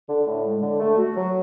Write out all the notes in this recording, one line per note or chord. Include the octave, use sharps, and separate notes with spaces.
D3
A2
G#3
D3
A3
F#4
F#3